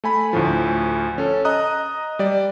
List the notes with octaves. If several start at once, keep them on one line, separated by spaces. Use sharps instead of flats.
A3 G#5 B5
D2 A2 F3
C#4 A4
D#5 A#5 D#6 F#6
G3 D5